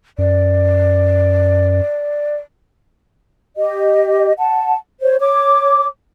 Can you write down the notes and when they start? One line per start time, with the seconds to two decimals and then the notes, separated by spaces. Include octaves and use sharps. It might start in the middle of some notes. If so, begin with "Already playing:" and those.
0.18 F#2 D5
3.58 G4 D#5
4.38 F#5 A5
5.01 C5 C#5
5.19 C#5 D6